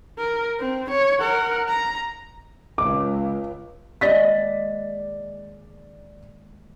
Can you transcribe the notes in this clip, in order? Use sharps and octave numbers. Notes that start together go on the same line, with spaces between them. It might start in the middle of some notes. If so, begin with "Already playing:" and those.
A#4
C4
C#5
A#4 F#5
A#5
C#2 D6
D#2 G#3 D5 D#5 A6 B6